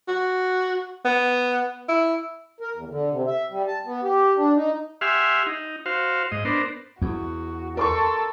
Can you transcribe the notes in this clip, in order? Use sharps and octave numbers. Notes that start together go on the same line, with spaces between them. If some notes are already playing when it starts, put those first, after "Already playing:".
F#4
B3
E4
A#4
E2
D3
C3
E5
G3
A5
B3
G4
D4
D#4
G4 E5 F#5 G#5 C6 F6
D#4
F#4 C5 F5
G#2 D#5
B3 D4 A#4 C5
E2 F#4
A4 A#4 C6 C#6